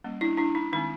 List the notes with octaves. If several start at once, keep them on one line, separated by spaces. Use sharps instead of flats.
G3 A#3 C#4
D4 E4
D4 E4
D#4
D#3 G#3 C4 D#4